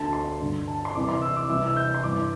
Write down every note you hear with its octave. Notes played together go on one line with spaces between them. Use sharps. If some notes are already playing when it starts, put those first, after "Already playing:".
Already playing: D2 D3 A5
C6
G2 D3
A5
C6
C2 C3 E3 D6
C6
E6
D6
C2 C3 E3 E6
E6
G6
C6
G2 E3 D6